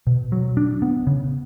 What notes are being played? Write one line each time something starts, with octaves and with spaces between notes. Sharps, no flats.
B2
F#3
D4
B3
C#3